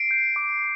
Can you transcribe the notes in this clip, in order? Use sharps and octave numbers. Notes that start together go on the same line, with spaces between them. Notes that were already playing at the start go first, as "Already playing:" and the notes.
Already playing: C7 D7
G6
D6